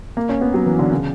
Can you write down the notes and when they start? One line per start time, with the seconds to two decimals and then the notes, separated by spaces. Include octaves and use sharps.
0.17 A#3
0.29 C#4
0.41 B3
0.54 F#3
0.66 E3
0.79 D3
0.91 C#3